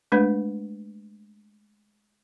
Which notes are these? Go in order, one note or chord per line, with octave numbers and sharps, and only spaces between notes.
G#3 A3 D4 B4